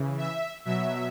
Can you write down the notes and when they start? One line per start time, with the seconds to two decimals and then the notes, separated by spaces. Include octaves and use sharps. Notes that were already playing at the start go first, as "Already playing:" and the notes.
Already playing: C#3 E3
0.18 E5
0.65 B2 F#3 E5